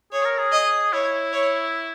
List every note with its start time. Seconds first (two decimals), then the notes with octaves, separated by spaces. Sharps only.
0.12 G#4 C#5
0.25 A#4
0.38 G#4
0.52 D#5
0.93 E4 C#5
1.32 C#5